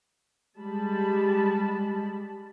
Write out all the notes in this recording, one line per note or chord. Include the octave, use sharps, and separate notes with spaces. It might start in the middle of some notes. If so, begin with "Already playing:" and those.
G3 G#3 A5 B5